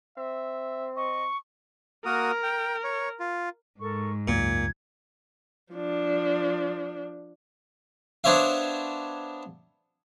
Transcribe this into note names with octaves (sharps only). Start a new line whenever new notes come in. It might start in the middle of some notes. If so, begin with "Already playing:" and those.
C4 E5
D#5 C#6
A#3 F#4 A#4 D#6
G5
C#5
F4
G#2 A4 A#4 C#6
C#2 F#2 A#2 C#3 G#6
F3 D4
B3 D4 C5 C#5 E5 F5